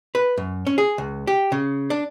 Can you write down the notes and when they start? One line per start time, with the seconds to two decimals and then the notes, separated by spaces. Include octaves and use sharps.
0.15 B4
0.37 F#2
0.67 C#4
0.78 G#4
0.98 C#2
1.27 G4
1.52 C#3
1.90 D4